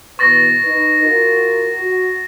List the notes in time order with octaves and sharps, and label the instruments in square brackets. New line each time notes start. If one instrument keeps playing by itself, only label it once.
[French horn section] B2 E3 B4 [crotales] C#6 A6 A#6
[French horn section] D#4 B4
F4 F#4 A#4
F#4